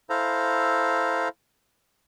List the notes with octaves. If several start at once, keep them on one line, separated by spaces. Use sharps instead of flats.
E4 A4 C5 F5 A#5